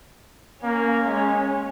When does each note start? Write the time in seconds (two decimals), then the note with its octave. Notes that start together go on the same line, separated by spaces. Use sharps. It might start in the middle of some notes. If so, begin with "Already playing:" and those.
0.63 A#3 C#4
1.05 G#3